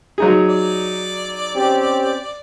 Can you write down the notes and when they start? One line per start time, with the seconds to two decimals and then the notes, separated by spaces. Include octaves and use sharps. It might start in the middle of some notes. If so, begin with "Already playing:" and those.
0.18 F#3 D#4 G#4
0.48 D5
1.55 C4 C#4 G4